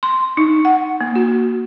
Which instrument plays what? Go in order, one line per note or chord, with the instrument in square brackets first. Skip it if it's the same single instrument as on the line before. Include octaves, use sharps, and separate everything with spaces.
[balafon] C6
D#4
F#5
A#3
F#4